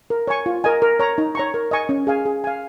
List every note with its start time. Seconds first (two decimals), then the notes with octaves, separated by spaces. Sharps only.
0.10 A#4
0.28 C#5 G#5 C#6
0.46 F4
0.64 A#4 D#5 G#5
0.82 A#4
1.00 C#5 A#5
1.18 D#4
1.35 C#5 A#5 C#6
1.54 A#4
1.71 D#5 G#5 C#6
1.89 C#4
2.07 G#4 F5 G#5
2.25 G#4
2.44 F5 G#5